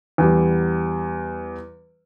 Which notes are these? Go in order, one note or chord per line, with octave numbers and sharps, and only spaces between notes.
E2 G3